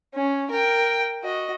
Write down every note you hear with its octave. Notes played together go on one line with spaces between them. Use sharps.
C#4
A#4 G5
F#4 D#5